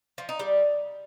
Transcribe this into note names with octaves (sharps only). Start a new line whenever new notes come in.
F3
D#4
G3